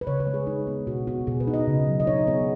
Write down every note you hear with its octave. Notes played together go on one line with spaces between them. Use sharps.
B4
C#3 C#5
B4
G#3
G#4
D#4
B3
B2 F#4
B3 F#4
B2 G#4
B4
D#4
D#5
C#3
F#3
D#5
D#4 C#5
B3 G#4